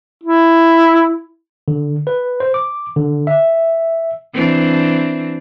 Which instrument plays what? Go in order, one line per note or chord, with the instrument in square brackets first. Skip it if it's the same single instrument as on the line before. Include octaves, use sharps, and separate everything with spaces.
[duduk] E4
[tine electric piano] D3
B4
C5
D6
D3
E5
[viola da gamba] E3 C4 D4